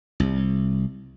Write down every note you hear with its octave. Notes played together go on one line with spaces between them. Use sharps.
C2